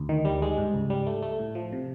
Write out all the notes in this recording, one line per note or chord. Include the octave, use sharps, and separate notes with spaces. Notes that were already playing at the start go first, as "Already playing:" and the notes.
Already playing: D2
D#3
G3
G#3
G#2
C#2
G3
A3
A3
A2
F3
C3